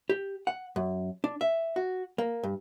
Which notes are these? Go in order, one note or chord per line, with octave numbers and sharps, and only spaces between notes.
G4
F#5
F#2
D4
E5
F#4
A#3
G2